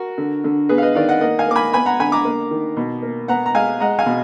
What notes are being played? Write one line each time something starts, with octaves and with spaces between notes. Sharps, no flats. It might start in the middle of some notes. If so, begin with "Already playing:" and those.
Already playing: F#4 A#4
D3
D3
B3 G#4 B4
F5
B4 D#5
D#3 D5 F5
D#5 F#5
A#3 D#5 F#5
F5 G#5
A#3 D6
G#5 B5
B3 G#5 B5
F#5 A#5
D3 G#5 B5
A#5 D6
A#3
D#3
B2
A#3
B3 F#5 A#5
A#5
G#3 F5 G#5
G#3 F#5 A#5
F5 G#5
B2